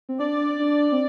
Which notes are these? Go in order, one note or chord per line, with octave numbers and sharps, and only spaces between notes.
C4
D4 D5
D4
C4